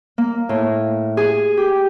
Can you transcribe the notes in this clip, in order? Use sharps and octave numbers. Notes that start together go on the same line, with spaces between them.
A#3
A2
G#4
G4